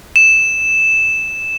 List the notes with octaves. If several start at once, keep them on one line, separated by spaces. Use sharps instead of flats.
E7